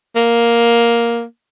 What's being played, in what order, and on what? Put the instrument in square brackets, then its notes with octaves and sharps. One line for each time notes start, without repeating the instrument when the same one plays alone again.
[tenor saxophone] A#3